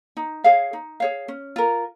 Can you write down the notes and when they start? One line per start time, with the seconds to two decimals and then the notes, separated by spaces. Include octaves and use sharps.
0.17 D#4
0.44 G#4 C#5 F5
0.73 D#4
1.00 G#4 C#5 F5
1.28 C#4
1.56 F4 A#4